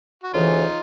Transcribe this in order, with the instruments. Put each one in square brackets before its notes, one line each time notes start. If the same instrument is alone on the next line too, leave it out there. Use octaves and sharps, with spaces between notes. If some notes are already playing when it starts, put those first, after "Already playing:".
[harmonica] F#4
[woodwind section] D2 C#3 E3 [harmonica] D#4 F4